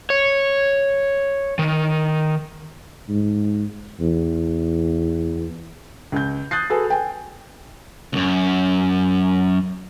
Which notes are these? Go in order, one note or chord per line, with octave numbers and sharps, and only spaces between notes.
C#5
D#3
G#2
E2
C#2 G6
D#6 F#6 G6 A6 C7
F#4 G#4 A4 B4
G5 G#5
C#2 F#2